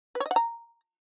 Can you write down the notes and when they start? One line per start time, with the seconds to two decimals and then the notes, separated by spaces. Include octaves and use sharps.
0.15 B4
0.20 C#5
0.26 D#5
0.31 F#5
0.36 A#5